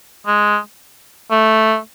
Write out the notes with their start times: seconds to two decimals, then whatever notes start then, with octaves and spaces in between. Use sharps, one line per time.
0.27 G#3
1.31 A3